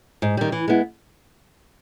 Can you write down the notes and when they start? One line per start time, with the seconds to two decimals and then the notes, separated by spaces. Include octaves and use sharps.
0.22 G#2
0.37 D#3 G3
0.52 E3
0.68 G#3 B3 E4